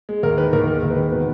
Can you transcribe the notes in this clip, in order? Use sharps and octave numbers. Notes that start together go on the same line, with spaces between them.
G#3
D#2 A#4
D#3 B4
D#2 A#4
G#3 A#4
D#2
B4
D#3
B2 B4